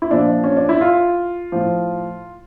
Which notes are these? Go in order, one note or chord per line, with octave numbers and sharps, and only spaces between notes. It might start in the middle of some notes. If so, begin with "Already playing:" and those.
E4
A#2 F3 D4
C#4
D4
E4
F4
A2 F3